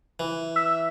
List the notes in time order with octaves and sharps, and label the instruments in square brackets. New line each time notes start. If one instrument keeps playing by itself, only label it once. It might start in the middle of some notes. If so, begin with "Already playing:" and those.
[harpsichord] E3
[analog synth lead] E5